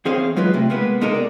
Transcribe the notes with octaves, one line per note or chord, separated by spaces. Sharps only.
E2 C4 G#4 C5 C#5 F5
F#3 G#3 F4 B4
C3 A3
G#3 A#3 B3 B4
B2 G#3 A#3 D#4 A4 A#4
D5